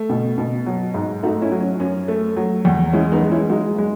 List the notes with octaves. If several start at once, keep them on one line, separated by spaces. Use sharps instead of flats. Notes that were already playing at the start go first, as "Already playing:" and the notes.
Already playing: A3
B2
B2
F#3
G#2
A3 D#4 F#4
C#4 E4
F#3
C#4
F#2 C#4
A3
F#3
E2
G#3 C#4 E4
B3 D#4
G#3
C#4 E4
G#3 D#4 F#4
G#3